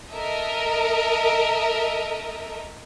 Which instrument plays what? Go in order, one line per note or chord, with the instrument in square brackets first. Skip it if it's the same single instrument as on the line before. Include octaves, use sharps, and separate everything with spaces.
[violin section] A4 A#4 D#5 E5